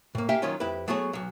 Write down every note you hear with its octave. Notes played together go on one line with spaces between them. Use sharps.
A2 A#3
A#3 G4 E5 F5 G5 G#5
D#3 F#3 C#4 F4
F2 E4 G4 B4
F#3 A3 B3 F#4 G#4 C#5
B1 F#3